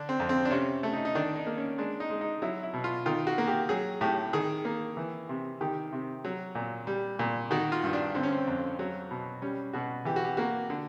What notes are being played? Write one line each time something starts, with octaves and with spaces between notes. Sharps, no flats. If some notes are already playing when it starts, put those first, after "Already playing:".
Already playing: D3 D4
C4
F2
C4
D4
C3 C#4
A3
D#4
D#4
D#3 D4
D#4
A#3
C#4
G#3 D4
D#4
G#3
D#4
F#3 E4
E4
B2
F4
D#3 F4
F#4
A#3
G4
F#3 G#4
A2 G4
D#3 G#4
A#3
E3
C3
D#3 G4
C3
F#3
A#2
G3
A#2
D#3 F#4
F4
G2
D4
D3 C4
C#4
C4
F2
F#3
B2
G3 C#4
B2 F#4
E3 G4
F#4
G4
A#3 F#4
D3